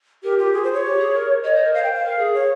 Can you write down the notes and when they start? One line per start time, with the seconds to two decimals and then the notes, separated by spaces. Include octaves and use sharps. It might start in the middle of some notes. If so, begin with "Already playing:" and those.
0.23 G4 A#4
0.38 F4 G4
0.53 F4 G#4
0.64 C5
0.73 C#5
0.83 G4
0.98 G#4
1.14 A#4
1.43 C#5 D#5
1.54 C5
1.64 A#4
1.74 C5 F5
1.83 G5
1.94 F5
2.04 A#4
2.18 G#4
2.34 C#5